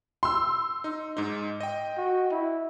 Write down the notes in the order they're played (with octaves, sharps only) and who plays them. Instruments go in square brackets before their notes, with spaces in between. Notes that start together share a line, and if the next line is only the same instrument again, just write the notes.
[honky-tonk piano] C6 E6
[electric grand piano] D#4
G#2 D#4
D#5 G5
[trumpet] F#4
E4